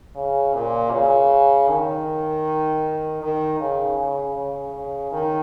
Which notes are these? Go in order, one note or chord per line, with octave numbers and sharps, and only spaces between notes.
C#3
A#2
C#3
D#3
D#3
C#3
C#3
C#3
C#3
D#3